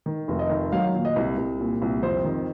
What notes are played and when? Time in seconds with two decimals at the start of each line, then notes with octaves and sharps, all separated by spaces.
0.06 D#3
0.28 F1
0.39 D#5
0.50 D#3
0.73 F#3 F5
0.94 A#2
1.05 D#5
1.16 C2
1.37 C2
1.60 A#2
1.82 C2
2.03 F2 C5
2.24 D#3